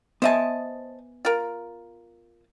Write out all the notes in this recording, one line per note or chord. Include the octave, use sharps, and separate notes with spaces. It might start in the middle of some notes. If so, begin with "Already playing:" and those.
B3 C5 D#5 E5 G#5 A5
F4 A#4